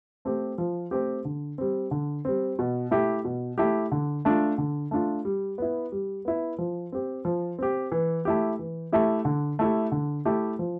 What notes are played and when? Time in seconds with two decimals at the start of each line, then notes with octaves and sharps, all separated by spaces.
0.25 A3 C4 G4
0.58 F3
0.91 A3 C4 G4
1.25 D3
1.58 G3 C4
1.91 D3
2.25 G3 C4
2.59 B2
2.91 A3 E4 G4
3.25 B2
3.58 A3 E4 G4
3.92 D3
4.25 A3 D4 F4
4.58 D3
4.91 A3 D4 F4
5.25 G3
5.58 B3 E4
5.92 G3
6.25 B3 E4
6.58 F3
6.92 C4 G4
7.25 F3
7.58 C4 G4
7.92 E3
8.25 A3 E4 G4
8.59 E3
8.92 A3 E4 G4
9.25 D3
9.59 A3 E4 G4
9.92 D3
10.25 A3 E4 G4
10.59 F3